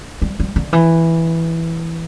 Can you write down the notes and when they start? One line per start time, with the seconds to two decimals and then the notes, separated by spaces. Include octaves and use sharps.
0.22 G3
0.40 G3
0.56 D3
0.73 E3